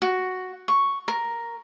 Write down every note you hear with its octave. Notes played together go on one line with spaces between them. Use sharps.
F#4
C#6
A#4